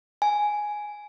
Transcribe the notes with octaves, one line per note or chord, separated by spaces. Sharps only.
G#5